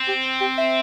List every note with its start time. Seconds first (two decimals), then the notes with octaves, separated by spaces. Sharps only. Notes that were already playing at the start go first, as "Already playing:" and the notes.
Already playing: C4
0.08 G4
0.41 G4
0.58 E5